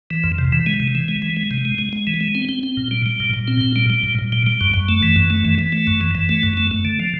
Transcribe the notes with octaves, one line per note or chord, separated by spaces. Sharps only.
E3
F2
C3
E3
G#3
C3
E3
G#3
E3
G#3
C3
G#3
G#3
G#3
E3
G#3
C4
C4
C4
A#2
G3
G3
A#2
A#2
C4
A#2
G3
G3
A#2
A#2
G3
G3
F#2
F#2
A3
E3
F#2
A3
E3
E3
A3
F#2
E3
E3
A3
F#2
A3
A3
D3
F3